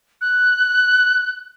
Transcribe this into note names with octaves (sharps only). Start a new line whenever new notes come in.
F#6